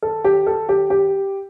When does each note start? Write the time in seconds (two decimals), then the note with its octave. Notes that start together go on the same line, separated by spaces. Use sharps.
0.03 A4
0.24 G4
0.47 A4
0.69 G4
0.90 G4